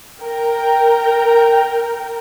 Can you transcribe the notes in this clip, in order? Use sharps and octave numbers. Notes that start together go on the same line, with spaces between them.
A#4 G5